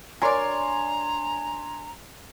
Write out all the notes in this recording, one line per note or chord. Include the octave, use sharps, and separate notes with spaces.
F#3 D4 A#4 C#5 D5 G#5 A#5 C6